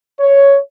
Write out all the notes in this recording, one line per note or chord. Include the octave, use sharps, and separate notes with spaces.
C#5